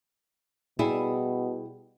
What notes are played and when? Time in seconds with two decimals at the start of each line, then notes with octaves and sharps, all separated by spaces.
0.79 B2 G3 E4 G#4